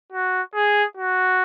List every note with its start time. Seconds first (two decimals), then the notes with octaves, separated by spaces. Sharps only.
0.12 F#4
0.55 G#4
0.97 F#4